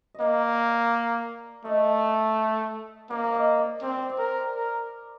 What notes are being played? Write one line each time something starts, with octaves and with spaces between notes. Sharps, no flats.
D#5
A#3 D5
A3 D#5
A#3 D5
D5
D#5
D5
C4 D5
C5
D5
A#4
A#4